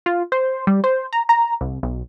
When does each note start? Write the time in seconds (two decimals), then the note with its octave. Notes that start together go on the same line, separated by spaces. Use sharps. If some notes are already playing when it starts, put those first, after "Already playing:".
0.06 F4
0.32 C5
0.67 G3
0.84 C5
1.13 A#5
1.29 A#5
1.61 C2
1.83 B1